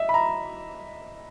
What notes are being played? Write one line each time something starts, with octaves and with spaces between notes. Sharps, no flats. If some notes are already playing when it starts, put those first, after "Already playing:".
Already playing: D#5 E5
B5
A#5